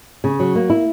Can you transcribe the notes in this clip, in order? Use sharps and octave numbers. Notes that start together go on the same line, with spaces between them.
C#3
F#3
A#3
E4